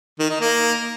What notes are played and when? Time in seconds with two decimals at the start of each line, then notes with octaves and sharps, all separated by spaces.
0.19 D#3
0.30 D#4
0.41 A#3